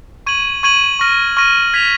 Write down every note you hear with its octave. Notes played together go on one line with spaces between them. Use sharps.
C#6 G#6 D#7 F#7
C#6 G#6 D#7 F#7
C#6 F6 A#6 D#7
C#6 F6 A#6 D#7
G#6 B6 F7